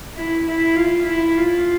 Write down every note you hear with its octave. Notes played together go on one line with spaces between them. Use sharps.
E4
E4
F4
E4
F4